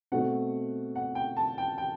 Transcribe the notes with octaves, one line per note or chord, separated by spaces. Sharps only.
B2 A3 C4 F#5
F#5
G5
A5
G5
G5